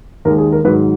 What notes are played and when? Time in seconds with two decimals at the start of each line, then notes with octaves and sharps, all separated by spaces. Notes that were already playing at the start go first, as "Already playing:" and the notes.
0.25 D#2 D#3 G#3 A#4
0.38 G#4
0.52 A#4
0.64 G#2 D#3 F#3 B4